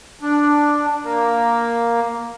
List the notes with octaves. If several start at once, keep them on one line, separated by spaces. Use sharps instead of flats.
D4
A#3